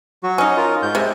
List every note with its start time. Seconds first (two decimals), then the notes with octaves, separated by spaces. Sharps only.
0.23 F#3 F#4
0.38 C#4 D#4
0.57 F4 A#4
0.83 G#2 G6
0.95 C3 G#3